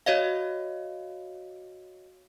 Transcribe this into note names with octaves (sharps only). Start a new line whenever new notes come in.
F#4 C#5 D#5 F5